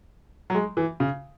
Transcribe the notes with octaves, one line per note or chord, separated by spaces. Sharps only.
F#3
G#3
E3
C#3